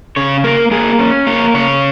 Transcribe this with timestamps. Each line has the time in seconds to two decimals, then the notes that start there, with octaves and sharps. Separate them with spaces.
0.16 C#3 C#5
0.44 A#3 A#4
0.71 A#3 G#4
0.99 C#4
1.27 A#3 C#5
1.54 C#3 C#5